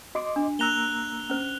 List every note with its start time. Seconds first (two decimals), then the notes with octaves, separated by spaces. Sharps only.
0.15 F#4 D#5 C6 D6
0.36 D4
0.59 A#3 A#5 E6 F#6 F7 G7
1.30 C#4 C5